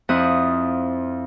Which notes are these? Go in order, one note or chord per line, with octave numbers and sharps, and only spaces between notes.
F2 F3 E4 D#6 F#6